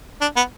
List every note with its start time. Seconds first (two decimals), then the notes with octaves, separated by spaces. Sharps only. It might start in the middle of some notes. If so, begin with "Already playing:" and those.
0.21 D4
0.36 B3